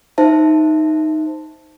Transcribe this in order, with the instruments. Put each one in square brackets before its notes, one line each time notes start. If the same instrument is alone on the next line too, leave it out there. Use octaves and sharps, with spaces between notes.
[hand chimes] D#4 C5 E5 A5